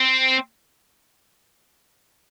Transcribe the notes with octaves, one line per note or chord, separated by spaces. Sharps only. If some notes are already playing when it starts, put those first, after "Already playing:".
Already playing: C4